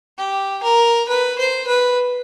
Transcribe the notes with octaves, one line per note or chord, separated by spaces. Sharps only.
G4
A#4
B4
C5
B4